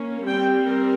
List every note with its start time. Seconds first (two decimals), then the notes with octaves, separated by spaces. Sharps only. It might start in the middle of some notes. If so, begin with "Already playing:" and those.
Already playing: A#3 C#4
0.27 G3 C4 G5
0.63 A#4